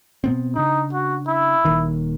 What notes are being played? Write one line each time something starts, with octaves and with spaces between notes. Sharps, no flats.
B2 B3 C4
C#3 D4 D#4
F#4
E4
D#1 D#2 D#3